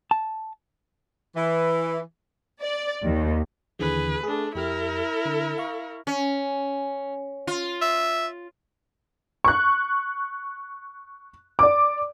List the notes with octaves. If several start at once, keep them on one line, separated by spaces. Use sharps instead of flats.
A5
E3
D5
D#2
D#2 D3 E3 G#4 B4
A3 D4 G#4 D#6
F2 E4 G4 A#4 F6
D3
F5 C#6
C#4
F4
E5
C#6 F#6
D5 D6